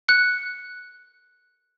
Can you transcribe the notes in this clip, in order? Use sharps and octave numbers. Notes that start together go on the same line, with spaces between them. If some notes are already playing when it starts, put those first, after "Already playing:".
F#6 C#7